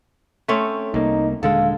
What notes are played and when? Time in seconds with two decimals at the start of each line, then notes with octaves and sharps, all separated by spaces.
0.48 A3 C4 C#4
0.94 C2 A#3 D#4
1.43 D#1 D3 G#3 A4 F5